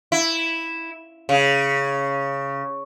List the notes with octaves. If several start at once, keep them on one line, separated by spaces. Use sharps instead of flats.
E4
C#3